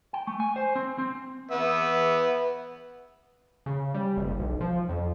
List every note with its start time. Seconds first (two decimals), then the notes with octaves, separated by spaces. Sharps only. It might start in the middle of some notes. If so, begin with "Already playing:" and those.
0.13 G5
0.27 A3
0.40 G#5
0.56 C5
0.76 C4
0.98 C4
1.51 B3 E5
3.66 C#3
3.94 G3
4.17 F#1
4.39 B1
4.61 F3
4.89 F2